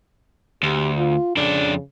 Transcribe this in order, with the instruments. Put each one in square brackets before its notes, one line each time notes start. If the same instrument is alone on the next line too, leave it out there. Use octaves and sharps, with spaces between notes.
[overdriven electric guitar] D2 [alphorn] G4
[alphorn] F4
[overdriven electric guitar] F2 D4 [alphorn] C#3